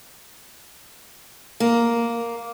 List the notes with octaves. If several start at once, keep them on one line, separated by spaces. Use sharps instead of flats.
A#3